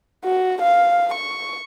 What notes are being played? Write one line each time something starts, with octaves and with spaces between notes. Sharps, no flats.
F#4
F5
C#6